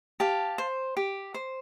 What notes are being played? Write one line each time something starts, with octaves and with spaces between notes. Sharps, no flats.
G4 F5 A5
C5
G4
C5